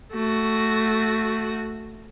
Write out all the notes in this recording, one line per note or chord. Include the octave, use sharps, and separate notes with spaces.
A3 F#4